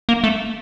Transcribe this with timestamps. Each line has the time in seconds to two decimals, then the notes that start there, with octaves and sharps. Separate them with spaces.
0.09 A#3
0.24 A3